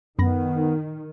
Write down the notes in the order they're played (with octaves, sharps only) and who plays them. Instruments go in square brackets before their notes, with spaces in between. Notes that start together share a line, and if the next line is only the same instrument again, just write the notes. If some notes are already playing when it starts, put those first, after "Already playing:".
[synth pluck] F#2 B5 A#6 [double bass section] D#3 [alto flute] B3